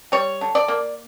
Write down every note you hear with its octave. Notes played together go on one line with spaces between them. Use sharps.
G3 C#5
D3
D5
A#3